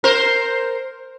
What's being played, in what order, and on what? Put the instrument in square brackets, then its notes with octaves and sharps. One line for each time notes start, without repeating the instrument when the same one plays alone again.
[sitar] A#4 C5